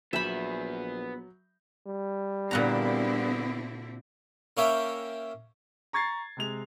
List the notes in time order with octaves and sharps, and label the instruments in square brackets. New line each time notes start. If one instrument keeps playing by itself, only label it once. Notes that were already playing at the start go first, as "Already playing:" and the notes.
[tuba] A#1 [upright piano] F#3 G6 [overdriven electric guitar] B3 G#5 [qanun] E5 B5
[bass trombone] G3
[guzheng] A#2 F#4 A#5 [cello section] D3 C4 E4 [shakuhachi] B3
[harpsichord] A#3 C#4 C#5 E5 G5
[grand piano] A#5 C#6 G#6 A6 C7
C3 G#3 F7